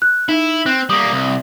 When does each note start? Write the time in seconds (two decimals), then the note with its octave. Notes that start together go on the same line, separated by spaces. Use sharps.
0.02 F#6
0.29 D#4 E4
0.66 C4 F#6
0.89 G3 A#3 D#6
1.11 C2